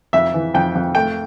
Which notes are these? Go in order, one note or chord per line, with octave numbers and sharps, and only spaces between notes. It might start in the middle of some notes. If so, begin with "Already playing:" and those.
F2 E5
E3
F2 G5
F2
A3 G5